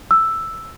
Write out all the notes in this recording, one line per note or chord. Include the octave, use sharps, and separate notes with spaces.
E6